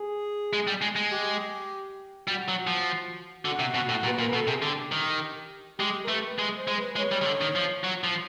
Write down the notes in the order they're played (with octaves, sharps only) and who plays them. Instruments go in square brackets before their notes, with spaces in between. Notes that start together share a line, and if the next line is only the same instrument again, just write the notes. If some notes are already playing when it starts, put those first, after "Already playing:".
Already playing: [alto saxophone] G#4
[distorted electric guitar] G#3
G3
G#3
G#3
[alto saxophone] G4
[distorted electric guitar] G3 [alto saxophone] F#4
[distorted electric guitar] F#3
F3
[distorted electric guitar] D3 [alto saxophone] F#4
[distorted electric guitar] C3
B2
A2
A#2
[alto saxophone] B4
[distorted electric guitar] A#2
[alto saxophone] A#4
[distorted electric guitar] B2 [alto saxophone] A4
[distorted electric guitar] C3 [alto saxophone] G#4
[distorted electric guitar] D3 [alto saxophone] G4
[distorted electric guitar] D#3
[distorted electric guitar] G#3 [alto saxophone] G4
[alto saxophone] A#4
[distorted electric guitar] A3 [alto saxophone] B4
[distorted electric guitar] G#3
[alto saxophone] C5
[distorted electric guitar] G#3
[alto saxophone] B4
[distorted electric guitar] G#3 [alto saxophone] C#5
[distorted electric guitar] G3
D#3
D3
D#3
F3
F#3
F3